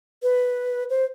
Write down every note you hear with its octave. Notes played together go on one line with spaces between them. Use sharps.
B4
C5